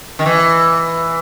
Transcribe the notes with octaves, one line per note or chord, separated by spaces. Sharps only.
D#3
E3